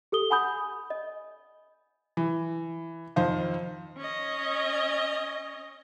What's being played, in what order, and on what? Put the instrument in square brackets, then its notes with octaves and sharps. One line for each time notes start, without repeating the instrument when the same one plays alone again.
[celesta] G4 A4 D#6 G7
F#5 G#5 B5 D#6 G6
D#5
[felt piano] E3
F2 D#3 C5 F5
[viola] C#4 D#5